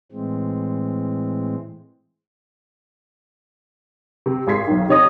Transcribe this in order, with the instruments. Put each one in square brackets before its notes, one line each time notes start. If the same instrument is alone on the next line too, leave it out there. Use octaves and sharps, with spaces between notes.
[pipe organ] A2 E3 G#3 C4
[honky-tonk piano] C3
G#1 G#4 C6 G#6 B6 C7
B1 D#3
C3 D#4 C#5 D#5 D#6 A#6